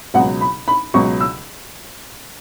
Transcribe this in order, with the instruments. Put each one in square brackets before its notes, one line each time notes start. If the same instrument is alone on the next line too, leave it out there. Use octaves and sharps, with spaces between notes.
[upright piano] C#2 B2 F#3 F#5
B5
B5
C#2 B2 F#3 C#6
E6